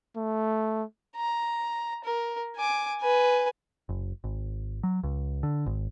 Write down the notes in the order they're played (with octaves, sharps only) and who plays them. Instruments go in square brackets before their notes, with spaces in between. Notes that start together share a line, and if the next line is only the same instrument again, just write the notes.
[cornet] A3
[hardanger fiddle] A#5
A#4
G#5 D6
B4 G#5
[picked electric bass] F#1
G#1
F#3
C#2
D3
G#1